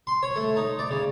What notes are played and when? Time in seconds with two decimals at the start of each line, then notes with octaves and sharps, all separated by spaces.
0.07 C6
0.23 C#5
0.36 A3
0.57 D#4
0.79 D5
0.91 C#3